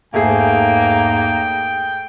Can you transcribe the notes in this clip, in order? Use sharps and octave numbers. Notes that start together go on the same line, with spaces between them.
E2 G#2 A3 A#3 G#4 G5